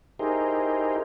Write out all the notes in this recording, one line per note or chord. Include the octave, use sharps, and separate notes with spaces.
D#4 E4 G4 G#4 A#4 C5